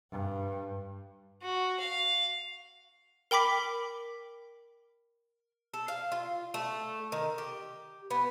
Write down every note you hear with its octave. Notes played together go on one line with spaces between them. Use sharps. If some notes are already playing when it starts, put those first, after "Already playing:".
G2
F#4
F5
A#4 G5 B5 D6 B6
A4
F5
F4
A3
D#3
G4
B3